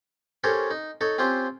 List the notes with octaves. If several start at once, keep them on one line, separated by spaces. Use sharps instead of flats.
C#4 G4 A4 A#4 C5 C#5
D#4
D#4 A4 C#5
C4 C#4 F4 G4 C5